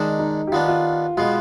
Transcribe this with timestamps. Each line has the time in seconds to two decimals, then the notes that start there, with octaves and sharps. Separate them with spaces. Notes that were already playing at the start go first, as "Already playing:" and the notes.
Already playing: D#3 G#3 D4 D#4
0.19 D#4
0.47 G4
0.52 D#3 B3 D4 F4
0.68 F4
1.17 B2 G#3 B3 F4